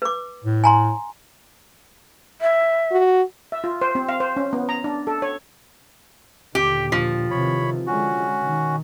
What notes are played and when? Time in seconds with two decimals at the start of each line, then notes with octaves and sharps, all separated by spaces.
0.02 B4 D6
0.44 A2
0.64 G#5 A#5 C6
2.41 E5
2.92 F#4
3.52 E5
3.64 F4
3.82 C5
3.95 C4
4.09 F5
4.20 C5
4.37 C#4
4.53 B3
4.69 A#5
4.84 D4
5.07 A4
5.22 C#5
6.55 D#2 A#2 D3 G4
6.92 F3
7.31 C3 D#3 E3 C#5 B5
7.87 D3 G#3 C#4 F#4
8.40 B2 D#3